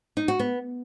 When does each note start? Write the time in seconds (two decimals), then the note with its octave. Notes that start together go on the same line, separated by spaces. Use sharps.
0.17 D#4
0.28 F#4
0.39 B3